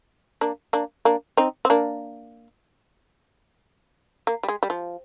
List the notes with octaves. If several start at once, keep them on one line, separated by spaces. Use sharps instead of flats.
A#3 D4
A#3 D4
A#3 D4
C4 D#4
C4
A#3 D4
A#3
G3
G#3
G3
F3